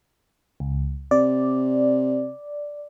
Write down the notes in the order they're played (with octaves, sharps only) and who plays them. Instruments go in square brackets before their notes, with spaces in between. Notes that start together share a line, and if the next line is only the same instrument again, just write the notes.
[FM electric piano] C#2
[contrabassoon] C3 [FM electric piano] D5